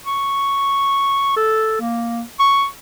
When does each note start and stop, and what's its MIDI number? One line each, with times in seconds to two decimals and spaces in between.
0.05 1.36 85
1.36 1.80 69
1.81 2.22 58
2.40 2.66 85